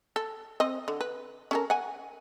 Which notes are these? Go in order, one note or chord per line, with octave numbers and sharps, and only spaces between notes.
A4
C4 D#5
D3
B4
C#4 A4 A#4
F#5 G#5